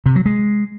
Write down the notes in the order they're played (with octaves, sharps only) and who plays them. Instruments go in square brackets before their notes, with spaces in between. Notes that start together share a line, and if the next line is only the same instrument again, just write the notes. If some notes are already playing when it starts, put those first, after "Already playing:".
[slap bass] C3
F#3
G#3